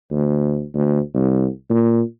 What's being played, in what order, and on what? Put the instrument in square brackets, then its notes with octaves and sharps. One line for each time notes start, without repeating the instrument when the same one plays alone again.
[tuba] D2
D2
C2
A#2